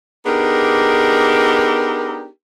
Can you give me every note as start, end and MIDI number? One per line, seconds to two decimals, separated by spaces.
0.26 2.26 59
0.26 2.26 62
0.26 2.26 63
0.26 2.26 67
0.26 2.26 68
0.26 2.26 70